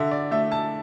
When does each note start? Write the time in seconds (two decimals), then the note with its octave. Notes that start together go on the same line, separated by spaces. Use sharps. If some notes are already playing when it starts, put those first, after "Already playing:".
Already playing: D3 E5
0.11 D5
0.31 A3 E5
0.52 A5